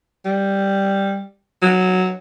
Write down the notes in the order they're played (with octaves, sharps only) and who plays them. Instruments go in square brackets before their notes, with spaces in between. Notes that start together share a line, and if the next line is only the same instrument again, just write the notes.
[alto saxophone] G3
F#3